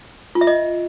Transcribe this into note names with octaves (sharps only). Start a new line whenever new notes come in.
F4
E5
D#5